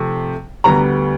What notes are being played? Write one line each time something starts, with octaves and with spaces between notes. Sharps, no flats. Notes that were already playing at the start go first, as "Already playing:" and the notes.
Already playing: C3 F3 A3
D2 D3 G3 B3 A#5